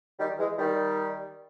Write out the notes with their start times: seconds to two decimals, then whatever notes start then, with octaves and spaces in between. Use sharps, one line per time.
0.19 D#3 G3
0.39 E3 G#3
0.59 D#3 G3